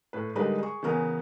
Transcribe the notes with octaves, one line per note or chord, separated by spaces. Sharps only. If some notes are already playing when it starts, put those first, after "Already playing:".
A2 B4
D3 G3 G#3 D#4 A#4 B4
G#4 C#6
C#3 E3 B3 A#4 C#5 G#5